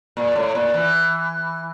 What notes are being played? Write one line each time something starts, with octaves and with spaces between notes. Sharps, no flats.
A#2
A2
A#2
E3